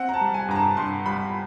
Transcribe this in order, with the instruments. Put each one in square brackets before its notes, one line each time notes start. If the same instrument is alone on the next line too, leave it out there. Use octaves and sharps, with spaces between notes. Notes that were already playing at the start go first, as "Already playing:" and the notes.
Already playing: [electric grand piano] C4 [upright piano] F#5
[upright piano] A#5
A5
[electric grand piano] G3
[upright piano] G#5
[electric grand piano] G2 [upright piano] A#5
[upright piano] A5
[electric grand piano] G2 [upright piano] C6
[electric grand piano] G3 [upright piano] B5